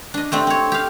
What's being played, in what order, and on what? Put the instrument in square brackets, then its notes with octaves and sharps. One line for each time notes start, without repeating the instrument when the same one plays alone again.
[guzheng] D4 D#5
A3 C4 D4 G4
C4 C#5
G4 F5